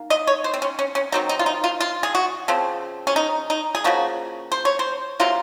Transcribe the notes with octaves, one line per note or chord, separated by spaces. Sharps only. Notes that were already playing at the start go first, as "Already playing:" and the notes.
Already playing: D#3 A#3
D#5
C#5
C5
C4
C#4
C#4
C#4
D#3 F#3 C4 D#4
D#4
F4
D#4
F4
F4
G#4
F#4
C#3 F3 C4
C#4
D#4
D#4
G#4
C#3 F3 A#3 F#4
C5
C#5
C5
C3 F#3 A#3 F4